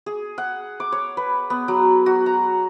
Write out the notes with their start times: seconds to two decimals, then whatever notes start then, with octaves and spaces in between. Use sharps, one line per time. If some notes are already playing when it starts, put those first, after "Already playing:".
0.06 G#4
0.38 F#5
0.80 D6
0.92 C#5
1.17 B4
1.50 B3
1.68 F#3
2.06 F#4
2.26 A#5